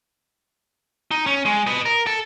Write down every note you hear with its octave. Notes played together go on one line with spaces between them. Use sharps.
D#4
C#4
G#3
B4 D#5
A#4
A4